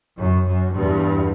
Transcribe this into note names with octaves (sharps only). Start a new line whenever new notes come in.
F#2
F#2
E2 G2